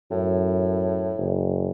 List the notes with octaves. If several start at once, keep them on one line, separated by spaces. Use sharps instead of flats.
F#2 A2
F#1